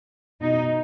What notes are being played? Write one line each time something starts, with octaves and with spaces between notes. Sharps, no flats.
B2 D#4